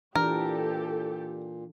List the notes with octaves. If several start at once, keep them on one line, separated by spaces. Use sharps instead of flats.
A#2 E3 D4 G4 A4 A#4